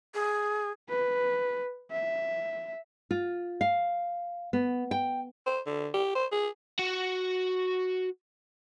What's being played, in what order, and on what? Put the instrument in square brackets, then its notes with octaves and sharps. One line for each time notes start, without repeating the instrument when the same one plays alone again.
[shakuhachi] G#4
[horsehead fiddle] B4
E5
[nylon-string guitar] F4
F5
B3
G5
[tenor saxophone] C5
D3
G4
C5
G#4
[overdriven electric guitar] F#4 F#5